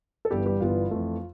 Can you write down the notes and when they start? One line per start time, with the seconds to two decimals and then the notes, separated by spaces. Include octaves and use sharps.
0.25 A4
0.31 G1 G2 E3 G3 B3 G4
0.46 G3 G4
0.61 G1 G2 E3 G3 B3 F4
0.91 F2 E3 A3